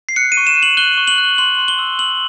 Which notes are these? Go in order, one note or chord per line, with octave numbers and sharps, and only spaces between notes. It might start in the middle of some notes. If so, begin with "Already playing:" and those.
C7
F#6 C#7
D#7
C#6
E7
F#6
F#7
F#6 G7
C#6
F#7
F#6
C6 F#7
C6
G7
E6
E6 F#7